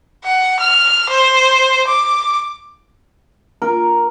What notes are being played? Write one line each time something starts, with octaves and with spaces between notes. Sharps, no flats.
F#5
F6
C5
D6
A#4